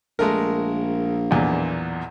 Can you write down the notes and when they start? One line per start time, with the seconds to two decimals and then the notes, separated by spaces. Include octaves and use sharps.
0.19 A#1 G#3 A3 A#4
1.31 B1 E2 A#2